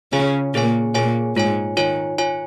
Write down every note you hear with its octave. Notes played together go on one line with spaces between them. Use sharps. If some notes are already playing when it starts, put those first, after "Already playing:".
C#3 C#4 F4 G#4 C#5 G#5
A#2 A#3 F4 G#4 C#5 G#5
A#2 A#3 F4 G#4 C#5 G#5
G#2 G#3 F4 C#5 G#5
D#3 F4 C#5 G#5
F4 C#5 G#5